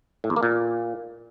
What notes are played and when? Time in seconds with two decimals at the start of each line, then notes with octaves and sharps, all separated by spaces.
0.24 A2
0.30 E2
0.36 A#3
0.43 A#2